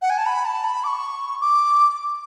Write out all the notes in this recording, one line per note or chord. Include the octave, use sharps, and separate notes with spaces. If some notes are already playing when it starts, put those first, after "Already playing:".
F#5
G#5
A5
B5
A5
B5
D6
C#6
D6